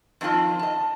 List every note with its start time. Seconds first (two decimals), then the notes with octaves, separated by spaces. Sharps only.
0.21 F2 D#3 C4 F4 A5
0.59 D#5 A5